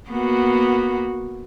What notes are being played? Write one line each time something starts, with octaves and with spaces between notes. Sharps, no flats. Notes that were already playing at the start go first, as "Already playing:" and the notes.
A#3 B3 F#4